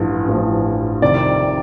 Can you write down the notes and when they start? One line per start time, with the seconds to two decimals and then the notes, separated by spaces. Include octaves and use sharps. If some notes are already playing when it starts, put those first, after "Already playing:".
Already playing: A1 G2 F3
0.28 A1 G2 F3
1.02 F2 C3 D#3 D5